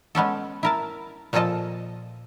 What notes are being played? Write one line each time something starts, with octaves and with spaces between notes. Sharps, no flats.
G#3 B3 C#4 A4
E4 A#4 A5
A#2 F3 F4 A4 D#5 A5